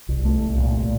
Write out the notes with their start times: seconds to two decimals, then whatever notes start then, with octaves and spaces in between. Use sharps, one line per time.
0.09 C2
0.25 A3
0.42 C2
0.57 A#2
0.74 A#2